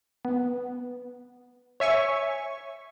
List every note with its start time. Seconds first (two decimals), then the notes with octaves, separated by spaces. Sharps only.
0.25 B3
1.80 C#5 E5 G#5 C#6